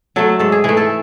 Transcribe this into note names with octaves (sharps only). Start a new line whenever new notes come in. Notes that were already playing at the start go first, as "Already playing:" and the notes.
F#3 A3 A4
G#2 A4
G#4
E3 A3 G#4
A4